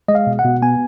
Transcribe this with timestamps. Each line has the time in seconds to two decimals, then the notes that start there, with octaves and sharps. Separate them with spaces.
0.08 G#3 D#5
0.15 F5
0.27 B2
0.39 F#5
0.45 B2
0.62 B3 G#5